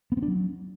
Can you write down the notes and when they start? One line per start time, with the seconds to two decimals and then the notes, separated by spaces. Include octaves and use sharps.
0.12 B3
0.17 C4
0.22 D4
0.28 F#3